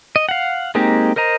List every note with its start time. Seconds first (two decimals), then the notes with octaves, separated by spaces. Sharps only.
0.16 D#5
0.29 F5 F#5
0.75 G#3 A#3 C4 D#4 G4
1.16 A#4 C5 D#5 A#5